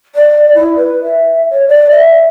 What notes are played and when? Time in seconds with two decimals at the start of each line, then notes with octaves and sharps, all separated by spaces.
0.15 D5
0.55 E4
0.76 B4
1.02 E5
1.50 C#5
1.68 D5
1.90 E5